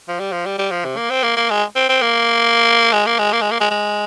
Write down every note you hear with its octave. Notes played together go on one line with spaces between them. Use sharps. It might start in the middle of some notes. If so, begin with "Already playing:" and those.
F3
G3
F3
G3
G3
F3
C3
A#3
C4
A#3
A#3
G#3
C4
C4
A#3
G#3
A#3
G#3
A#3
G#3
A#3
G#3
G#3